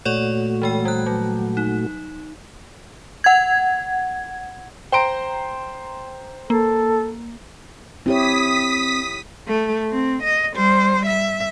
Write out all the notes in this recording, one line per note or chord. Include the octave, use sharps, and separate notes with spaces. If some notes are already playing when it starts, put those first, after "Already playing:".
A#2 A3 F#4 C#5 D5 C#6
E3 G#3 G5
G3 F#6
F#3
D#4
F#5 G#6
C5 G5 A#5 C6 D7
A#3 A4
C4 E4 G4 C#5 D#6 B6
A3
C4
D#5
G3 C5
E5